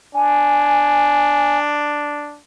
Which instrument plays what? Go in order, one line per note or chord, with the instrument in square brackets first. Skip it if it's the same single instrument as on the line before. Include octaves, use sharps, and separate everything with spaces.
[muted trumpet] D4 [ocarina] G#5